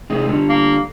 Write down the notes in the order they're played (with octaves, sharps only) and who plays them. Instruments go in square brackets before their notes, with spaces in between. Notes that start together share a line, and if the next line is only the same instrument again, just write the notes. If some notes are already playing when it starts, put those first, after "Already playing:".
[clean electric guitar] C3 G#3 D#4
D3 G3
[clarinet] A#3